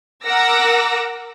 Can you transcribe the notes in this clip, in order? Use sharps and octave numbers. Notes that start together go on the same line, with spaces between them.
A#4 F#5 D6 E6 A#6